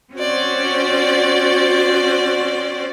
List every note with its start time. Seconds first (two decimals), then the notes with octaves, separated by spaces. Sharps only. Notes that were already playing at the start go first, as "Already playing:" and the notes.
0.14 C4 C#4 F#4 C5 D5